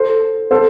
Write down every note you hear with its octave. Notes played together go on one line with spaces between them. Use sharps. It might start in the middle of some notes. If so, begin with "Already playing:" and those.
Already playing: A4 C5
A4 C5